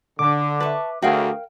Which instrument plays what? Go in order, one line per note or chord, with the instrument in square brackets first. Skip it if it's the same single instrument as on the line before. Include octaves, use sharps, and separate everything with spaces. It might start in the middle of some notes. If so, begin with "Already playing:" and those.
[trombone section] D3 [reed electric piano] D6
[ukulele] B4 E5 [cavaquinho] A5 C#6
[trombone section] D2 [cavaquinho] F#4 G#4 [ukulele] A#4 F5 G5